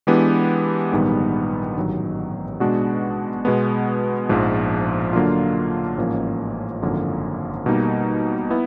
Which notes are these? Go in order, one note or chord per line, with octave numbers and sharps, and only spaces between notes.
E3 G#3 B3 D4 G4
A#1 G#2 D#3 G3 B3
A1 G2 D#3 F#3
B2 G#3 B3 D4 F#4
B2 G#3 B3
A#1 G#2 F3
D3 F#3 A#3 D4 F4
A1 G#2 F3 A#3 C#4
G#1 F#2 D3 F3 A#3
B2 G3 A#3 D#4
B3 E4